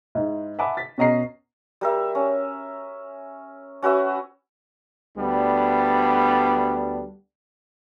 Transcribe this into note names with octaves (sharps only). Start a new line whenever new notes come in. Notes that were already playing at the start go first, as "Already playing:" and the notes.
G#2 E4
E5 F#5 G#5 A5 B5 D6
A6 B6
B2 C#4 D#5 A#5 F6 C7
G3 A#4 E5
C#4
C#4 F#4 B4 E5
D2 G3 B3 D4